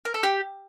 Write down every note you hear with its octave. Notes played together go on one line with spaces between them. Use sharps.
A#4
A4
G4